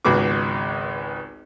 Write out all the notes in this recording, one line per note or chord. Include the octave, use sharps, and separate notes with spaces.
G#1 C#2 G#3 B3 F#4 D6